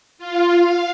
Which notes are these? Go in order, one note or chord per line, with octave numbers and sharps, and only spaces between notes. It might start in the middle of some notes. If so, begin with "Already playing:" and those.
F4
F5